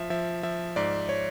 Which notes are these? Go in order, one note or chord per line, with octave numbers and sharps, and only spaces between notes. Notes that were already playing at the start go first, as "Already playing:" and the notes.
Already playing: F3 E5
F3 E5
F3 E5
G#2 D5
C#5